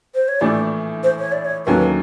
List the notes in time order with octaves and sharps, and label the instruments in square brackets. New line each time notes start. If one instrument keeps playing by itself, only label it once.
[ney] C5
C#5
[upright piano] A#1 A2 E3 A3 D4 [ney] D5
[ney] C5
C#5
D5
C#5
[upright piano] D#2 D3 F#3 A#3 C#4 [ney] B4